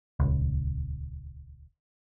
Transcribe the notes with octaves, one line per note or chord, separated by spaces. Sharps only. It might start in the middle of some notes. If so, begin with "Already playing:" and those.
D#1 C#2